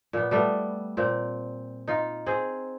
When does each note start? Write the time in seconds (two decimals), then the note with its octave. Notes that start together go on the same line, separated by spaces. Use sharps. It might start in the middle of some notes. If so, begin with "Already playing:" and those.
0.13 A#2 B3
0.31 G3 A3 B3
0.97 A#2 C4
1.88 D#4 F4
2.26 C4 G#4